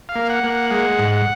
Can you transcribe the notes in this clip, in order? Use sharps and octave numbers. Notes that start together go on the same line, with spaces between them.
F5
A#3
F#5
A#3
F#5
G#3 F#5
G#2
F#5